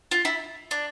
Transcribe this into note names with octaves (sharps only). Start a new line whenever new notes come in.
F4
E4
D4